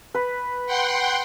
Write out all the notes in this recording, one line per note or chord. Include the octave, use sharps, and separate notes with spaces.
B4
F#5 G5 C6